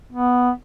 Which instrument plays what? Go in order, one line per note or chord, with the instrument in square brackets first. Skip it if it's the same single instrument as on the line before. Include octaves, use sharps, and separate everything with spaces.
[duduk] B3